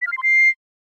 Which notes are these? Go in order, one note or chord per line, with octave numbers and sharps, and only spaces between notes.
B6
F6
C7
C6
C7